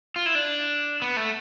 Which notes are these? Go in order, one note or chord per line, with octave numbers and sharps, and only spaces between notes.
F4
E4
D4
B3
A3